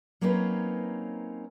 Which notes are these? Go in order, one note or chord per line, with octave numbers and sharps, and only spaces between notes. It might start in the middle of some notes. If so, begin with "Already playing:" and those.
F#3 A#3 C4 C#4 D#4 B4